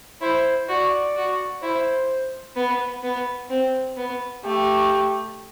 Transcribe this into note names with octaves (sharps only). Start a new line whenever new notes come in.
E4 C5
F#4 D5
F#4
E4 C5
B3
B3
C4
B3
A3 G4